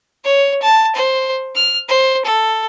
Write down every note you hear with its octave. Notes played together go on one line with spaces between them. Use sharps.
C#5
A5
C5
F6
C5
A4